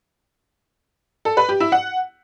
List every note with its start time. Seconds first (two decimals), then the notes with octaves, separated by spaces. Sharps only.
1.25 A4
1.37 B4
1.49 G4
1.60 E4
1.72 F#5